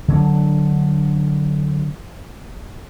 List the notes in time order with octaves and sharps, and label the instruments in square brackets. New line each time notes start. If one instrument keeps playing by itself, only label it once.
[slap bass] D3 F#3 D4